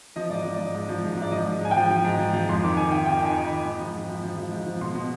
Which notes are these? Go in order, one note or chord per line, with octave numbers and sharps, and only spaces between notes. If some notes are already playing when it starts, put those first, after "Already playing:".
F3 D#5
G#2 D5
F3
G#2 D5
G#2
F3
G#2
G#2 D5
F3 D#5
G#2
G#2 G#5
G5
F3
F3
G#2
F3
F3
F2 C6
D#3 D6
D#3 G#5
D#3 G5
D#3 G5
D#3 G#5
D#3
B5
D#3
G#2
F3
G#2
F3
F3
F3
G#2
F3
B2 C6
B2